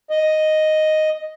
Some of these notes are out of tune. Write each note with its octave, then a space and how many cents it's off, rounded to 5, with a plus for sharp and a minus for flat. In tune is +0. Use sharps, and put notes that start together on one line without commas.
D#5 +0